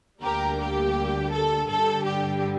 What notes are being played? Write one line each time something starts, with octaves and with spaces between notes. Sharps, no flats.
D2 D3 G3 A#3 G4 A#4
G4
A4
G2 D3 G3 A4
G4